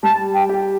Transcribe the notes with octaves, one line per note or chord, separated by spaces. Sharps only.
G3 A5
G5
G4